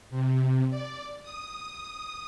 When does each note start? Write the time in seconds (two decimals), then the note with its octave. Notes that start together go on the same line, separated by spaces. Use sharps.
0.10 C3
0.70 D5
1.22 D#6